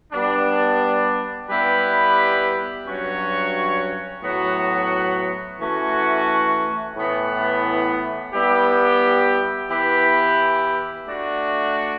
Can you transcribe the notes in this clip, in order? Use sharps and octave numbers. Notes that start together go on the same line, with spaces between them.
G3 B3 D4
G3 B3 E4 G4 B4
G2 F#3 C#4 F#4 C#5
A2 F#3 B3 F#4
E3 A3 C#4 F#4
A2 E3 B3
G3 B3 E4 G4
E3 B3 E4 G4 B4
A3 D4 F#4